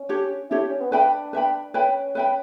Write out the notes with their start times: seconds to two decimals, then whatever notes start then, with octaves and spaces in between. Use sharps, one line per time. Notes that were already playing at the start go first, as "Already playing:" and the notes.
Already playing: C#4
0.09 D4 G4 C#5
0.50 D4 E4 G4 C#5
0.71 C#4
0.81 B3
0.92 D4 B4 E5 G5 B5
1.33 B4 E5 G5 B5
1.74 C#4 B4 E5 G5 B5
2.15 B4 E5 G5 B5